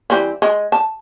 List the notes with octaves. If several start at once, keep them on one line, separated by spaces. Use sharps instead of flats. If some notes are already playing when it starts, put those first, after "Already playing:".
E3 G3 C4
G#3
A5